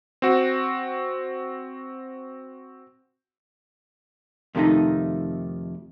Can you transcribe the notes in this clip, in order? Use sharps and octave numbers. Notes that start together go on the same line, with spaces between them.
C4 F#4
F2 C3 D#3 G#3 A3 D#4